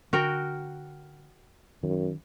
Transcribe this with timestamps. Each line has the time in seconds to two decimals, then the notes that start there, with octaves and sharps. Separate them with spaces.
0.13 D3 F#4 A#4 G5
1.83 F#2 D#3